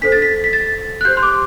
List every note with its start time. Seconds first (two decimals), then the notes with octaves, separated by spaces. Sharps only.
0.01 D4 A4 C5 B6
0.12 A6
0.22 B6
0.44 B6
0.53 A6
1.01 F#6
1.05 G4 C5 G6
1.17 C6
1.23 D6